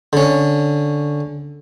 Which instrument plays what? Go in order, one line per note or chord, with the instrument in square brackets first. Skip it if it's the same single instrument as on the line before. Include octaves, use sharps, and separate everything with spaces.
[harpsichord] D3 C#4